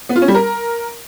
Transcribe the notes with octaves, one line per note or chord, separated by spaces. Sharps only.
B3
F4
C#4
G3
A#4